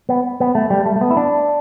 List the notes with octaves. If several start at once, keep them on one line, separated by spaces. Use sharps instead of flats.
B3
B3
A3
G3
A3
A3
B3
E4
D4